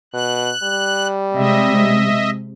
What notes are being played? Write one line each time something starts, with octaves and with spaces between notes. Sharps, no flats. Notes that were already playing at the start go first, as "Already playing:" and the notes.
B2 F#6
G3
C3 G#3 D#5 E5